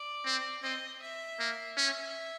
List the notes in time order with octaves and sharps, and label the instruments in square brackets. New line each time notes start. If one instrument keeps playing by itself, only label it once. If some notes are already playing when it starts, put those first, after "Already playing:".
Already playing: [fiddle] D5
[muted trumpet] C4
[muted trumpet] C4 [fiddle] D#5
[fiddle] E5
[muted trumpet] A#3
[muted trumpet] C#4 [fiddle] E5